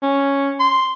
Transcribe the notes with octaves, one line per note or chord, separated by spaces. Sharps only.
C#4
C6